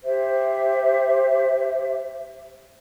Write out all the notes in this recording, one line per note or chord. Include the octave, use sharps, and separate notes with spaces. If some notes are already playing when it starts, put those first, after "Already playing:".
G4 C5 E5